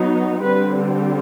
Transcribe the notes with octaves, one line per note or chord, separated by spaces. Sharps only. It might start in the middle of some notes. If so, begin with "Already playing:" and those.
Already playing: F#3 B3 D#4
D3 G3 C4 B4